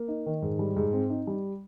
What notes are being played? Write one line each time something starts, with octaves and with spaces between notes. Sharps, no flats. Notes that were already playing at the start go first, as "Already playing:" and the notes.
Already playing: A#3
D#4
D#3
G#2
G3
G#2
C4
D#4
G3